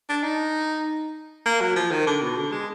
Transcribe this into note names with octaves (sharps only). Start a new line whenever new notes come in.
D4
D#4
A#3
F#3
F3
D#3
D3
B2
D3
G#3